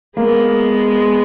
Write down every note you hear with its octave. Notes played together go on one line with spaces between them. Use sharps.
G#3 A#3 B3